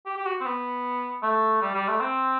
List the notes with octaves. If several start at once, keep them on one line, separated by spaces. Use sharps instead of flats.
G4
G4
F#4
C4
B3
A3
G3
G3
A3
C4